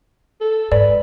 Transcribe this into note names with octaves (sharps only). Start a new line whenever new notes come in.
A4
G#2 B4 D5